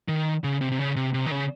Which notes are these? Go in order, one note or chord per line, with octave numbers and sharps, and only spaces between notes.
D#3
C#3
C3
C3
C#3
C3
C3
D#3
C#3